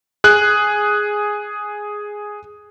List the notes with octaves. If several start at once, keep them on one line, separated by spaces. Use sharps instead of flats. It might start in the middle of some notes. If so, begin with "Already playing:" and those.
G#4 F#6